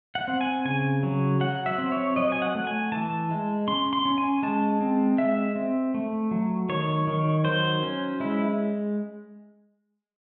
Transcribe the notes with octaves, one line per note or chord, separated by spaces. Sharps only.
F#5
C4
G#5
C#3 G#5
F#3
F#3 F#5
E5
C4
C#5
F#3 D#5
G#5
F#5
A3
G#5
E3 A5
G#3
C#4 C6
C6
C#4
G#5
G#3 A5
C4
G#3 E5
C4
A3
F#3
D#3 C#5
D#3
F#3 C5
C#4
G#3 E4